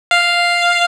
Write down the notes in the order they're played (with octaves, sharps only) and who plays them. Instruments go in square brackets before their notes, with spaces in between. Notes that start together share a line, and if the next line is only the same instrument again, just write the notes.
[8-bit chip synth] F5